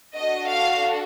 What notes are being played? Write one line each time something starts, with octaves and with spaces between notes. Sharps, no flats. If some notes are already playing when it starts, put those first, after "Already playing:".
D4 F#4 A4 D#5
F5